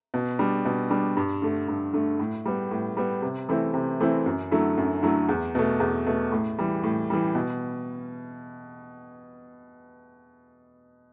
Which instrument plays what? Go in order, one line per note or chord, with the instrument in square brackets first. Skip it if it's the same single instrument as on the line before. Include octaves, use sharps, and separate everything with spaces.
[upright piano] B2
G3 D4
B2
G3 D4
G2
D3 A3
G2
D3 A3
A2
G3 B3
A2
G3 B3
C3
E3 A3 C4 E4
C3
E3 A3 C4 E4
F#2
D3 F#3 A3 E4
F#2
D3 F#3 A3 E4
E2
B2 A3
E2
B2 A3
A2
E3 G3
A2
E3 G3
B2